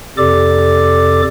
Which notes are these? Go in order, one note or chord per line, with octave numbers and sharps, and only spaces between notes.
F2 C3 G4 A4 D5 D6